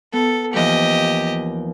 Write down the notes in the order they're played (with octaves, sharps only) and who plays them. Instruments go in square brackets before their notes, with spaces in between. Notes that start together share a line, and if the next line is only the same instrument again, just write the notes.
[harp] B3 [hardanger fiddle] A4
[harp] D#2 E3 F3 [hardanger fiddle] G4 D#5